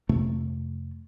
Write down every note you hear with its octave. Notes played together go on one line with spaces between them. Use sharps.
F2 C3 A3